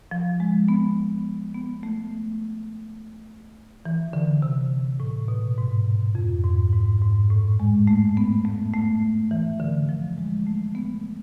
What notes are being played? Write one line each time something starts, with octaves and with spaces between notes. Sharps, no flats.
F3
G#3
B3
B3
A3
E3
D3
C3
A2
B2
G#2
F2
G#2
G#2
G#2
A2
G#3
A3
B3
A3
A3
E3
D3
F3
G#3
A3
B3